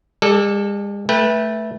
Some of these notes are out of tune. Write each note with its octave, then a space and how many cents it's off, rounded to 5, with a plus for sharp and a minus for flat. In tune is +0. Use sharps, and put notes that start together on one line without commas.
G#3 -45 A4 +0 D5 +0
A3 +0 B4 -20 G5 +30